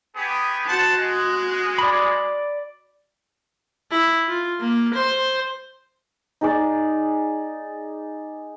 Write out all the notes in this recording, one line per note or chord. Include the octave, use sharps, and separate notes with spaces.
B3 G4 G#4
F#4 C5 F#5 A5 F#6
G#3
D5 B5
E4
F4
A#3
C5
D#4 G#4 D5